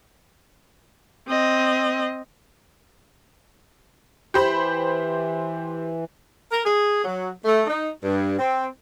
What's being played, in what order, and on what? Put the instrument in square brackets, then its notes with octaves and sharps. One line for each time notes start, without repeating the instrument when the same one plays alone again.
[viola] C4 D#5
[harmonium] E3 [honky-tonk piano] G4 C5 B5
[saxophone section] A#4
G#4
F#3
A3
D#4
G2
C4